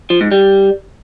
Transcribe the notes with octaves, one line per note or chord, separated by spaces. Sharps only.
F3
G#2
G3